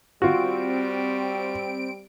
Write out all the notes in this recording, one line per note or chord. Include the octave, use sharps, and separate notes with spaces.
G3 C4 F4 F#4 D7